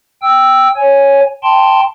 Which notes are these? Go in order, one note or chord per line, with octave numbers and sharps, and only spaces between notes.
G5 E6
C#5 G#5
G5 A5 C6